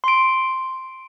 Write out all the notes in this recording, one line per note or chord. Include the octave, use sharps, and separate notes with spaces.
C6 D7